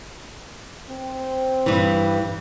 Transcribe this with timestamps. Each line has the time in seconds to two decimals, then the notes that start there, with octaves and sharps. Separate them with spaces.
0.88 C4
1.66 G2 E3